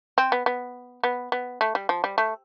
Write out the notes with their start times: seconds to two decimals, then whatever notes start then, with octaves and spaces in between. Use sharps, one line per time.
0.18 C4
0.32 B3
0.46 B3
1.04 B3
1.32 B3
1.61 A3
1.75 G3
1.89 F3
2.04 G3
2.18 A3